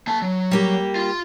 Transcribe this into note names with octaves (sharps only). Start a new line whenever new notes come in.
A#3 A5
F#3
G3 A#3 G4
F4 C6